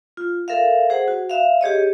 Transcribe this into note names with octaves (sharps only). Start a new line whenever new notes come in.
F4
A4 A#4 E5 F5
G#4 C5 F#5
F#4
E5 F5
G4 G#4 C#5 D#5